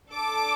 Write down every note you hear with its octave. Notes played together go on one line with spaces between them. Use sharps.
D4 A4 D6